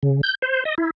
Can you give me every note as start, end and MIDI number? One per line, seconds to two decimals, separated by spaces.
0.03 0.21 49
0.23 0.35 91
0.42 0.64 72
0.65 0.75 75
0.78 0.90 64